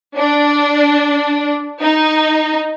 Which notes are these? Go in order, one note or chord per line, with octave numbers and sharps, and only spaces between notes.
D4
D#4